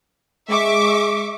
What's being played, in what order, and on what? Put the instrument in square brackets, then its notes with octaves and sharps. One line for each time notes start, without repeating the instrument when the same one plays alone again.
[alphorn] G#3 [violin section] E5 C#6 D6